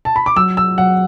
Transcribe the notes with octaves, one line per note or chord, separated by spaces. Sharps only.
A5
B5
D6
F#3 E6
E6
F#3 F#5